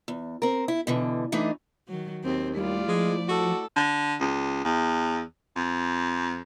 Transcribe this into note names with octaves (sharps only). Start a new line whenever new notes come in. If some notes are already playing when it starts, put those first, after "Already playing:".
E2
C4 A#4
E4
B2 D3 E3
E3 A3 D4 D#4
D#3 F#3
D#2 C4
G3 A3 E4 F4 D5
F3 G#3
F#4 A4
D3
C#2
E2
F2